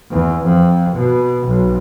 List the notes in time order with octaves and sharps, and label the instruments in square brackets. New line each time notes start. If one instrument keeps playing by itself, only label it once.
[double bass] E2
F2
B2
B1